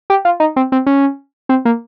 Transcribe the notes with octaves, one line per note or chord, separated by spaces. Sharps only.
G4
F4
D#4
C4
C4
C#4
C4
A#3